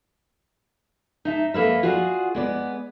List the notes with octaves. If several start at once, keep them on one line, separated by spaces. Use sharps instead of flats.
D#4 E5 A5
A#3 A4 B4 D#5 E5
F4 F#4 G#4 D5 F#5
G#3 B3 D5